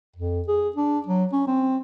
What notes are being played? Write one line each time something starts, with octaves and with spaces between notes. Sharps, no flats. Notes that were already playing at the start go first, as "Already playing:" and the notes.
F2
G#4
D4
F#3
C#4
C4